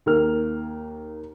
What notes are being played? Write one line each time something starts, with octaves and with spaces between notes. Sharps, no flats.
D#2 A#3 F6